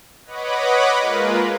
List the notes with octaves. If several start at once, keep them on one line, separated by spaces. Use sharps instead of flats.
B4 C#5 D#5 F#5 B5 D6
G#3 A#3 F4 A#4 B4